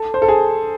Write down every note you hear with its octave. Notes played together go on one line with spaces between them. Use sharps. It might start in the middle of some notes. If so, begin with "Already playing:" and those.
Already playing: A4
C5
A4
G#4